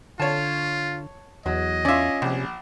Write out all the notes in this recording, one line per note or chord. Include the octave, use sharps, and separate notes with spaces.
D3 F4 C#5 A5
E2 F#3 D#5
C#4 F4 D5 E5
A#1 C3